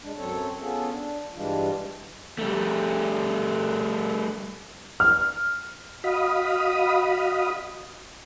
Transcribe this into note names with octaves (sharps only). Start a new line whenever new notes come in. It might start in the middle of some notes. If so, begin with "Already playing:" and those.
G#3 D4
F#2 F#3 C4 A4 C#5
B3 C#4 F4 G#4 A4
D4
G2 E3 G3 G#3 D4 F4
G3 A3
F6
F#4 D#5 F5 B5 D#6